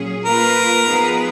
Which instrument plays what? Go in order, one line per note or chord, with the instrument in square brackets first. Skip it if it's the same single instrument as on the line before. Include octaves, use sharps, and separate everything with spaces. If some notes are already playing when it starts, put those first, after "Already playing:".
Already playing: [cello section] A#2 F#3 C#4 G#4
[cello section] A#3 F4 B4 [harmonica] A#4
[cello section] F3 B3 D#4 G#4 B4